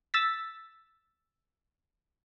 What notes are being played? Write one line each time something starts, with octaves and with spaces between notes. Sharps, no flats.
E6 A6 B6